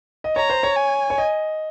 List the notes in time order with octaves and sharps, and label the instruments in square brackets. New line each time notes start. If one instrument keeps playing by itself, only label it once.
[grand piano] D#5
[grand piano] C#5 [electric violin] A#5
[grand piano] C5
C#5
[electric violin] G#5
[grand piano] C#5
D#5